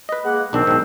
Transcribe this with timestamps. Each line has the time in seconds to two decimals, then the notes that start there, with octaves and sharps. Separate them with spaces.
0.09 B4 D#5
0.24 G#3 A#3 F#5
0.53 B1 D#3 C4 D4
0.67 B1 G#2